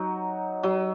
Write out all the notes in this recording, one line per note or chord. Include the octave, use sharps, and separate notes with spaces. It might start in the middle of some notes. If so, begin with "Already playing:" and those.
Already playing: F#3 D#4
F#3